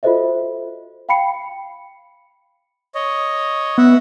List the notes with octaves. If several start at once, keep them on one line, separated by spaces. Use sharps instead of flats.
F4 F#4 A4 C5 D#5 E5
F5 G5 B5 C7 C#7
C#5 D#5
B3 E5 F#5